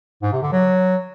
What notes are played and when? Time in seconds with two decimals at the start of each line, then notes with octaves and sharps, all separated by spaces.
0.23 G#2
0.32 C3
0.42 D3
0.52 F#3